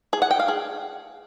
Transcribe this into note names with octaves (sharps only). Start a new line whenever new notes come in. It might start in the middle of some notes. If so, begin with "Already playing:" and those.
G#4
F#5
G5
F5
G#4